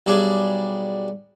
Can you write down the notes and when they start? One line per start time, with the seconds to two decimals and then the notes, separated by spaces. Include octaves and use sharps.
0.06 B1 G3 D4 G#4